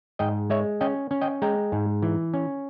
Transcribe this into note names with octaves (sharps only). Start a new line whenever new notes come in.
G#2 D#5 G5
G#3 C#5 E5
C#4 D#5 G5
C#4
D#5 G5
G#3 G5 A#5
G#2
E3
C#4